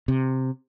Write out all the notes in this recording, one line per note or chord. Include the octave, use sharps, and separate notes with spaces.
C3